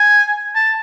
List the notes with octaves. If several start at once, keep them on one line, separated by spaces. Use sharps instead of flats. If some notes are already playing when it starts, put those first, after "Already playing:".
Already playing: G#5
A5